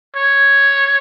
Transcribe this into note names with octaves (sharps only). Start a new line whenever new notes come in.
C#5